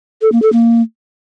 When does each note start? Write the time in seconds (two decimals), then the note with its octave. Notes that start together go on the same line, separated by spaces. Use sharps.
0.22 A4
0.32 A#3
0.42 A4
0.53 A#3